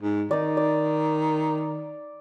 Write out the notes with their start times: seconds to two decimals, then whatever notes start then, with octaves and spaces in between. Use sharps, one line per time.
0.02 G#2
0.31 D#3 D#4 D5
0.57 D5